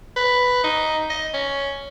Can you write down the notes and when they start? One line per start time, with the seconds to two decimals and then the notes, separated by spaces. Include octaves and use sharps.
0.16 B4
0.64 D#4
1.10 D#5
1.34 C#4